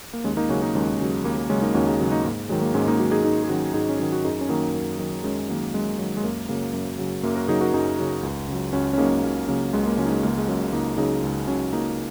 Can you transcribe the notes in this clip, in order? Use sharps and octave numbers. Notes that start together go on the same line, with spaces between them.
A#3
D#2 G#3 C#4
A#3 D#4
C#3 F#3 C#4 F#4
A#3 D#4
D#2 G#3 C#4
C#3 F#3
D#2 A#3
A#3
C#3 F#3 G#3 C#4
A#3 D#4
D#2 C#4 F#4
D#4 G#4
C#3 F#3
A#3 D#4
G#2 A#3
D#3 F#3 G#3
A#3
G#2 G#3 C#4
A#3 D#4
D#3 F#3 C#4 F#4
D#4 G#4
G#2 D#4 G#4
G#4
D#3 F#3 C#4 F#4
G#2 D#4 G#4
C#4
D#3 F#3 D#4
F#4
F#2 D#4 G#4
C#4
D#3 F#3 A#3 D#4
F#2
D#3 F#3
F#2 G#3 C#4
D#3 F#3 A#3
F#2 G#3
D#3 F#3
G#3
F#2 A#3
C#3 F#3 A#3
F#2
C#3 F#3
F#2 A#3
F#4 A#4
C#3 F#3 D#4 G#4
F#4 A#4
F#2 D#4 G#4
C#3 F#3
C#2
C#3 F#3
C#2 C#4 F#4
C#4
C#3 F#3 A#3 D#4
C#2 A#3
C#3 F#3 A#3
C#2 G#3
A#3
C#3 F#3 G#3 C#4
D#4
G#3 C#4
C#2 A#3
G#3
C#3 F#3 A#3
C#2 A#3 D#4
C#3 F#3 D#4 G#4
C#2 D#4 G#4
C#3 F#3 C#4 F#4
C#2 A#3 D#4